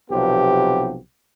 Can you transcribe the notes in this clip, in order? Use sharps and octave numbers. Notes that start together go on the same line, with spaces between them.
B1 C3 F3 B3 G4